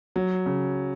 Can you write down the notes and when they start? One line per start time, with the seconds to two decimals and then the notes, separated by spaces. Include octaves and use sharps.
0.16 F#3
0.46 C#3